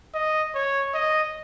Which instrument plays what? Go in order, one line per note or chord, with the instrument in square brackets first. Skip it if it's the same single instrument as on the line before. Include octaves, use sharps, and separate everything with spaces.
[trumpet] D#5
C#5
D#5